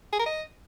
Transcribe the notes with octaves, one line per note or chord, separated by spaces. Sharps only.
G#4
A#4
D#5